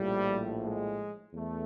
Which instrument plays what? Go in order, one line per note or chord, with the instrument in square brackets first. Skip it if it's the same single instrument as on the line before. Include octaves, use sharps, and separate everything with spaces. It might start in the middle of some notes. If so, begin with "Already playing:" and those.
Already playing: [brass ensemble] A#1 A2 F3 G3
G#3
E2 A3